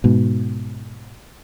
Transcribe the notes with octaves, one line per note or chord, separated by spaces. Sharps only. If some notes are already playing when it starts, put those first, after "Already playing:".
G#2 B2